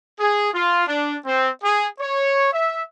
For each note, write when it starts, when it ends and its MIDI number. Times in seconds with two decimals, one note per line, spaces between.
0.20 0.49 68
0.54 0.84 65
0.87 1.15 62
1.25 1.48 60
1.62 1.85 68
1.99 2.51 73
2.53 2.81 76